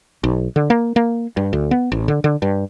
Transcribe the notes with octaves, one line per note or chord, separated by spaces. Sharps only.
B1
D3
A#3
A#3
G2
D2
B3
A1
D3
D3
G2